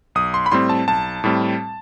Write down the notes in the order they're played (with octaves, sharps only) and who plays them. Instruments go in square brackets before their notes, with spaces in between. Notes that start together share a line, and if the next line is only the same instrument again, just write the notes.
[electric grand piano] B1 D#6
C6
B5
A2 G3 C4 C6
A5
B1 A5
A2 G3 C4